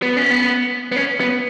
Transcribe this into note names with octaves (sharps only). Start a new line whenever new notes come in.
B3
C#4
B3
B3
C#4
B3